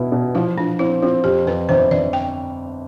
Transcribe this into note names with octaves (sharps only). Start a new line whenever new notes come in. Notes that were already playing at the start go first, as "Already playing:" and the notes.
Already playing: B2 E4
B2
F3 E4
F3 D4
C4 E4
C4 F4
F2 G4
F2 B4
G1 C5
G1 D5
G5